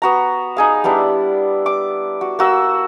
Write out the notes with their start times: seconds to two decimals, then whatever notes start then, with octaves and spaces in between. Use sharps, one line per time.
0.02 B3 F#4 A#5
0.57 D#4 G#4 F5
0.84 G3 B3 D4 E4
1.66 D6
2.21 F#4
2.39 A#3 F#4 E6